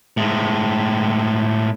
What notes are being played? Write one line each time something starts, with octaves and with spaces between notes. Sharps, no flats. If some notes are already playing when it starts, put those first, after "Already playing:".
A2 G#3